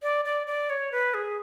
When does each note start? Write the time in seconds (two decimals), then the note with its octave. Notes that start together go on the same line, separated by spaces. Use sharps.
0.03 D5
0.25 D5
0.47 D5
0.70 C#5
0.92 B4
1.14 G#4